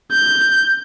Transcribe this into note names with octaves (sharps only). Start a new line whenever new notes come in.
G6